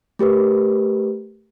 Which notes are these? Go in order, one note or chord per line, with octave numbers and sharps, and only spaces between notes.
A3 G4 A#4 B4